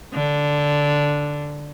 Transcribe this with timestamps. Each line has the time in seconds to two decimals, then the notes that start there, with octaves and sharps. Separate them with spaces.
0.14 D3